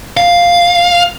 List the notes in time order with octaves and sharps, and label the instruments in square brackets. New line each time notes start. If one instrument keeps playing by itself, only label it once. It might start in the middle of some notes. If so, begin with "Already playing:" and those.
[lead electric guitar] F5